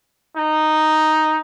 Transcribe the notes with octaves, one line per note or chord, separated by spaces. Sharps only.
D#4